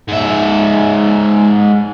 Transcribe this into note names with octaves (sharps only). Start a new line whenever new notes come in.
G#2 E5